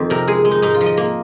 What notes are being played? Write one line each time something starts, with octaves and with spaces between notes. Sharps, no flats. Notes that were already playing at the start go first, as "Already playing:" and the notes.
Already playing: F2 D#3
C3 A#4
G#3 G#4
G#3
D#4
G#2 D#4
F4
F3
D#5
A#3